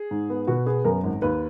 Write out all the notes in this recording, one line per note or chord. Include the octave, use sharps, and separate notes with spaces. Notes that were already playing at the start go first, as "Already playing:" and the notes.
Already playing: G#4
G#2
B3
B2 F#4
B3 G#4
F#2 A#4
G#1
D#2 B4